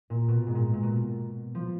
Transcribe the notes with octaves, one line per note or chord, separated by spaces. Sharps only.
A#2
B2
G#2
A#2
A#2
B2
F3